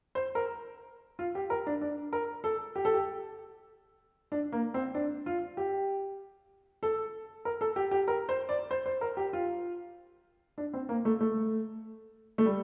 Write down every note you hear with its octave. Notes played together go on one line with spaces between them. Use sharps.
C5
A#4
F4
G4
A#4
D4
D4
A#4
A4
G4
A4
G4
D4
A#3
C4
D4
F4
G4
A4
A#4
A4
G4
G4
A#4
C5
D5
C5
C5
A#4
G4
F4
D4
C4
A#3
A3
A3
A3
G3